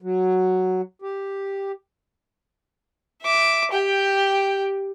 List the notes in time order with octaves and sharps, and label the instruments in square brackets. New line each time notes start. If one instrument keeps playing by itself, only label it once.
[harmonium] F#3
G4
[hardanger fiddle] E5 D6
G4 G5